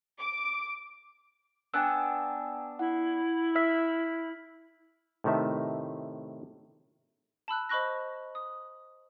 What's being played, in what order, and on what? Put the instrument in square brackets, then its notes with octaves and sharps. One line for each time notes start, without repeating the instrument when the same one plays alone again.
[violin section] D6
[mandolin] B3 D4 F#6 [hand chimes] G5 G#5 E6
[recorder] E4 [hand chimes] F#5
[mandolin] E5 [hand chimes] F6 B6
[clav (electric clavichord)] A2 C3 D#3 A3 E5
[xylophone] A5 B5 E6 F#6
C5 D#5 B5 C#6 F#6 A#6
D#6